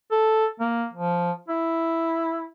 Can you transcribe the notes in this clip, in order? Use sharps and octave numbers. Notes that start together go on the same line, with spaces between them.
A4
A#3
F3
E4